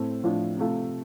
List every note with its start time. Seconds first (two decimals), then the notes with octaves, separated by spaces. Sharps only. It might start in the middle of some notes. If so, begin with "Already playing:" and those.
Already playing: A2 A3 C4
0.24 A2 F3 D4 F4
0.57 C3 A3 F4